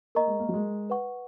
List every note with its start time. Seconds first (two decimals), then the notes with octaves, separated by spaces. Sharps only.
0.15 A#3 A#4 D#5 A#5 C#6
0.27 G#3
0.39 A#3
0.49 F#3
0.53 G#3
0.90 B4 F#5 C#6